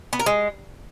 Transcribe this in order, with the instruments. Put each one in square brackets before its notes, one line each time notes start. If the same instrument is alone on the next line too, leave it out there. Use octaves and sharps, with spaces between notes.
[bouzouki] B3
A#4
G#3